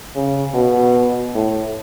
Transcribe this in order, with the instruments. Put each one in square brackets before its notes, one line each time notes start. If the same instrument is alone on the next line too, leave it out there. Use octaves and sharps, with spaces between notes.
[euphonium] C#3
B2
A2